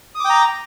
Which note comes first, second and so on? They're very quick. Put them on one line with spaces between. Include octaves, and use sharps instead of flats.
D#6 D6 G5 A#5